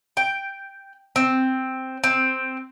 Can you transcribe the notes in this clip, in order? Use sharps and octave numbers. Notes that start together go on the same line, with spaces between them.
G5
C4
C4